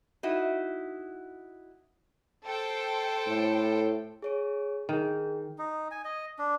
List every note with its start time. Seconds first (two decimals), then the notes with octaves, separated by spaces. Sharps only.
0.23 D#4 E4 F#4
2.45 A4 C5 G5
3.27 A2
4.22 G#4 C#5 D7
4.89 D#3 G#4 G5
5.58 D#4
5.91 G#5
6.05 D#5
6.39 D4